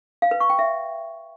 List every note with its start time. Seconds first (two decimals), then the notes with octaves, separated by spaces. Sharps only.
0.22 F5
0.31 B4
0.40 C#6
0.50 G5
0.59 E5